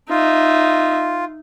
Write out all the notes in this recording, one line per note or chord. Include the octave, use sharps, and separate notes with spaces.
D#4 F4 E5